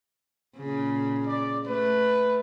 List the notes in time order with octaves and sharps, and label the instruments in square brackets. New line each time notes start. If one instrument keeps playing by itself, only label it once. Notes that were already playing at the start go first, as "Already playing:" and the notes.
[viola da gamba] A#2 C#3
[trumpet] D5
[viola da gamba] A3 [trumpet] B4